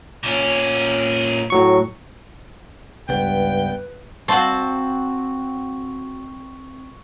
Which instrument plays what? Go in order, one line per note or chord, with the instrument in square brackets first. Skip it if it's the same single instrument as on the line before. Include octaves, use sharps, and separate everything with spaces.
[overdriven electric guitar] A#2 C#4
[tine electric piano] A2 F#3 C#6
[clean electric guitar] C#2 B3 [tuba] G2 [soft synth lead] B4 [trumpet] G5
[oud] C4 F5 [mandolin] F#4 A5 [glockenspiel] C6 C#6